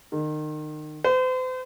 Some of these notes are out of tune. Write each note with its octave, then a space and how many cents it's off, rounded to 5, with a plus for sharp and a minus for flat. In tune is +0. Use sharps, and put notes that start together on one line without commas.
D#3 -30
C5 -40